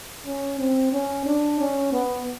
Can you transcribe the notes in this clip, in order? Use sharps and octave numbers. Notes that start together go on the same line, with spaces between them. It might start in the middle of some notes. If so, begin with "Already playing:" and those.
C#4
C4
C#4
D4
C#4
B3